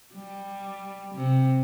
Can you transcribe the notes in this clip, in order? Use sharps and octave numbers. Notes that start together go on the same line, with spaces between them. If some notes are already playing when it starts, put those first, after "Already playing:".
G3
C3